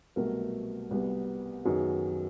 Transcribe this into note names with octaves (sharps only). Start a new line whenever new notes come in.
C2 B2 F#3 A3 A#4
C2 B2 G3 B3
F#2 D#3 F#3 B3 D#4 G#4